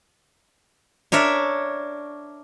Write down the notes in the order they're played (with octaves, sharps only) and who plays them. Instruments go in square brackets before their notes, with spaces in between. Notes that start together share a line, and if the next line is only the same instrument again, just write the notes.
[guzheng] D4 A#4 C#5 E5